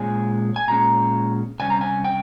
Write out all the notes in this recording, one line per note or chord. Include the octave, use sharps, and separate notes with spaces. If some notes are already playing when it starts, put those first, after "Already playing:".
Already playing: A#2 G#3 C#4 G#5
G#5
A#2 G#3 C#4 A#5
C3 G3 C#4 G#5
A#5
G#5
G5